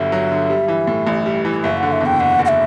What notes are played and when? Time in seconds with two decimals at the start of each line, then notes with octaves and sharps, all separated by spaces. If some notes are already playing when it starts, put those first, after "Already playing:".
Already playing: G1 G2 D3 F#3 E5
0.12 F#3
0.31 D3
0.50 G3
0.68 E3
0.87 A2
1.07 A1
1.26 G3
1.45 E3
1.63 F#1 E5
1.77 F#5
1.83 D3
1.92 E5
2.01 E2
2.06 G5
2.20 F#1 F#5
2.39 F#1
2.45 F#5
2.48 E5